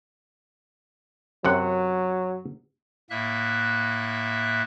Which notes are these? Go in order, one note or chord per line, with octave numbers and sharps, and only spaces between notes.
F#2 C3 F#3 F#5
A2 A#3 E5 F#6